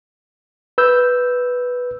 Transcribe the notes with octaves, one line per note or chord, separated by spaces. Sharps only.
B4 E6 G6